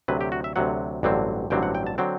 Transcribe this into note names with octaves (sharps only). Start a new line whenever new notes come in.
D2 C3 F#3 B4
G4
F#4
E5
D2 C3 F#3 F#5
A1 G2 D3 F#3 C4
A1 G2 D3 F#3 C4 G5
F#5
G5
A5
D3 F#3 C4 G5